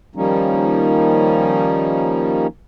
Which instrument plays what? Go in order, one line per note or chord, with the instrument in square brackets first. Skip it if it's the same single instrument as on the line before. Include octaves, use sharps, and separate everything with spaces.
[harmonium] D#3 F3 G3 A#3 C#4 D#4